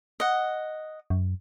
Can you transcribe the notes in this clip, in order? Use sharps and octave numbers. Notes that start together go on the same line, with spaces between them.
D#5 F#5
F#2